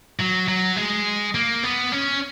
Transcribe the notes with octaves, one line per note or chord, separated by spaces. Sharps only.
F#3
F#3
G#3
A#3
B3
C#4